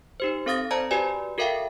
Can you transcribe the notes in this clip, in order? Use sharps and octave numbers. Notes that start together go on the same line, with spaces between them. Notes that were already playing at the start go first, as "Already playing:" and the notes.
D#4 G4 C5
C4 A4 F5 D#6 A6 A#6
C5 D5 A5 A#5 G#6
F#4 G4 B4 D5 G#5
F#4 A4 A#4 E5 F5 G5